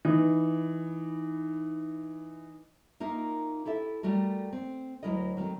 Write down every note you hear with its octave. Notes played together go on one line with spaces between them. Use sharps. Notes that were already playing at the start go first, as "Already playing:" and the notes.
E3 D#4
A#3 D#4 F4 A#4 E5
E4 G4 A4 E5
G3 A3 F#4 A#4
C4
D2 E3 F#3 E4 A#4 D#5
D#3 F#3 A3 C4